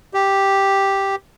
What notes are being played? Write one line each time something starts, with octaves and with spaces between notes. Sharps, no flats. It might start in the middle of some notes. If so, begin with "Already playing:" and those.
G4